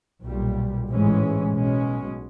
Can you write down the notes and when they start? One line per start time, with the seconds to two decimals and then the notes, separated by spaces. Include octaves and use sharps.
0.23 B1 A#2 G3
0.89 A1 G#2 E3 G#3 C#4
1.55 B1 B2 G#3 C#4